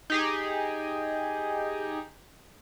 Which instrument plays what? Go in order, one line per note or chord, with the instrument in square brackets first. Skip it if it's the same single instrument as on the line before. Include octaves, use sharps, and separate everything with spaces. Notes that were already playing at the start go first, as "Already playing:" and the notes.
[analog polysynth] D#4 G4 G#4